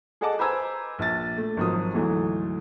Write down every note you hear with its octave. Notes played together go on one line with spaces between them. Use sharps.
G#4 A4 D#5 F#5 A5 D6
B4 C5 G#5 A#5 E6 G#6
A#1 A6
A3
G#1 D#3 F3 F#3 D#6
D2 G#2 E3 F#3 A3